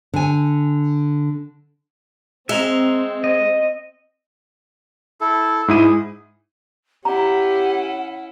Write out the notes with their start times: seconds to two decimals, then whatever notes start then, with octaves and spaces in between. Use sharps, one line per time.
0.14 D3 G#5
2.49 G#3 C4 E5 A#5
3.24 D#5
5.21 E4 A4
5.68 G#2 E4 G#4 D#7
7.05 C#4 E4 G4 F#5 A#5